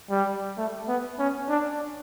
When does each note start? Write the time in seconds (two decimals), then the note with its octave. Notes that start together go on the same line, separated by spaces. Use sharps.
0.10 G3
0.57 A3
0.88 B3
1.19 C#4
1.49 D4